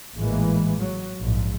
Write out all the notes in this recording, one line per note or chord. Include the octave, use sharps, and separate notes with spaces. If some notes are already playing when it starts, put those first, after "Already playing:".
A1 A#2 E3 G#3 A#3
F#3
A#1 G#2